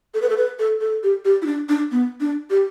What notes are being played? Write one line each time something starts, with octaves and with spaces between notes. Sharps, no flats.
A4
B4
A4
B4
A4
A4
G4
G4
E4
D4
D4
B3
D4
G4